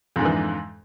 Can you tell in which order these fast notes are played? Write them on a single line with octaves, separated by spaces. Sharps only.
F2 G#2 D3 E3